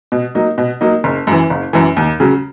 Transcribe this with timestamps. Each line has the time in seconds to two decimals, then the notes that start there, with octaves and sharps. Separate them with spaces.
0.12 B2
0.35 F#3 A#3 D#4
0.58 B2
0.81 F#3 A#3 D#4
1.04 F#1
1.27 F#2 E3
1.50 F#1
1.73 F#2 E3
1.97 D#2
2.20 C#3 F#3